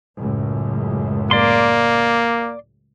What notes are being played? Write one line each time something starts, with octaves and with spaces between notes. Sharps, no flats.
C#2 F#2 A2
A#3 D5 C6